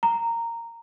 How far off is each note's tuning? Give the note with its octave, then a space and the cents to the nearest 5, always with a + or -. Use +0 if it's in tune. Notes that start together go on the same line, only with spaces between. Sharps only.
A#5 -10